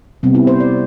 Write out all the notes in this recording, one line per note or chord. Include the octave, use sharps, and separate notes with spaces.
C3 G3 B3 C4
E4
C5
D5